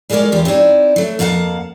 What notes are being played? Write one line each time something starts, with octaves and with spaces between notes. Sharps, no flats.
G3 G#3 F4 A#4 C#5 D5
E2 F4 G4
C4 D#4 E4 C#5 D5
F#3 A3
F2 A#3 F5 F#5 A5